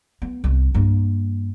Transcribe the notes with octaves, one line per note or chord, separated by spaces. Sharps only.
B3
C2
G2 A#3